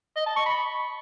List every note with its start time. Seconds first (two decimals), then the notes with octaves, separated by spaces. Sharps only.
0.16 D#5
0.26 A5
0.36 C#6
0.46 B5